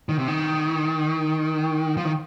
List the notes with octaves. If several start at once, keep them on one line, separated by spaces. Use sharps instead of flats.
D#3
C3
D#3
F3
D#3